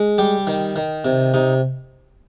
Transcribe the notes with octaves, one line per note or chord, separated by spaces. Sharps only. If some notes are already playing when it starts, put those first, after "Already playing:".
Already playing: G#3
G3 G4
D#3
D#3
C3
C3 D#4